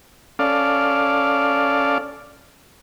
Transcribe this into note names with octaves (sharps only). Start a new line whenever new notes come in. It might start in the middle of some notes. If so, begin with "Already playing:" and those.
C#4 A4 D5 F5